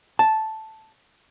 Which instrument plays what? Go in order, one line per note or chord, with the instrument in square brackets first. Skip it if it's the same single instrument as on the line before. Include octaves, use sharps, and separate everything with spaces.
[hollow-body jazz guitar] A5